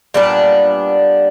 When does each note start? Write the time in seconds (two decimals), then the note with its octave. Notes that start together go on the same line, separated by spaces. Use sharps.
0.14 A#2 G3 B3 D4